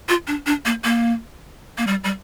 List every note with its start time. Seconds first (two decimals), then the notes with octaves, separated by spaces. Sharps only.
0.09 F4
0.27 D4
0.46 D4
0.65 A#3
0.84 A#3
1.78 A#3
1.87 G3
2.04 G3